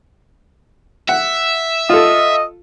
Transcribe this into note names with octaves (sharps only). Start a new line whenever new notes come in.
E5 F#5
F4 A4 D#5